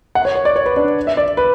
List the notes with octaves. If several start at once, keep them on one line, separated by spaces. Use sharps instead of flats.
F#5
C#5
C#5
D5
C#5
B4
D4
E5
D5
B4